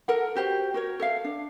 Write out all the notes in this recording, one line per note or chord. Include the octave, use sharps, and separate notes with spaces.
A4 A#4 F#5
F#4 G4 C5
F#4 A#4 C#5
A4 E5 F5
D4